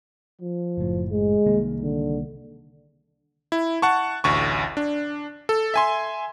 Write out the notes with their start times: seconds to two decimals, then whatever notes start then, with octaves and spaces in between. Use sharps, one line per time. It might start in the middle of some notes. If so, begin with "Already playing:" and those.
0.41 F3
0.78 F#1 A2
1.10 G#3
1.46 C2 D#3 A#3
1.82 D3
3.52 E4
3.82 F#5 A5 C#6
4.24 A1 D2 C#6
4.77 D4
5.49 A4
5.74 E5 G#5 C6